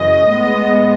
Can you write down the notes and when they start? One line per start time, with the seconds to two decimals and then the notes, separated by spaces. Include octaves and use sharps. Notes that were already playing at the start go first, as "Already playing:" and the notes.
Already playing: F#2 C#3 E3 D#5
0.26 A2 G#3 B3